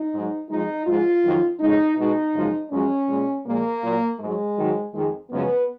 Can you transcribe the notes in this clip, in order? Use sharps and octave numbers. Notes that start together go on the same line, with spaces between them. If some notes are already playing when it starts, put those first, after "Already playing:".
Already playing: D#4
G#2 F#3
F2 F3 G#3 D#4
G#2 F3 G#3 F4
F2 D#3 F#3
F2 C#3 G#3 D#4
B2 G#3 D#4
F#2 C#3 F3 G#3
F#2 F3 G#3 C#4
A#2 G#3
A#2 F3 G#3 A#3
A#2 F#3
G#2 F#3 G#3
G#2 D#3 F#3
F2 D#3 G#3
F#2 C#3 F3 G#3 B3